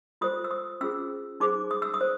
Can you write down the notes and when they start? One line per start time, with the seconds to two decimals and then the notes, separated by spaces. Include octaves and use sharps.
0.21 F4 A4 C5 D#6
0.44 E6
0.51 D#6
0.81 C#4 F4 G#4 C5 E6
1.40 D#4 G#4 C5 D6
1.71 D#6
1.82 E6
1.94 D#6
2.01 C5